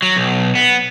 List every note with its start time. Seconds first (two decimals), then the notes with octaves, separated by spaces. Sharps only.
0.02 F#3
0.16 B1
0.55 B3